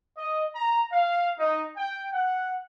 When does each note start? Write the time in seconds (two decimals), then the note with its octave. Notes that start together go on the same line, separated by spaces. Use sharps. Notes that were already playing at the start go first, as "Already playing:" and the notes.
0.16 D#5
0.53 A#5
0.91 F5
1.36 D#4
1.75 G5
2.12 F#5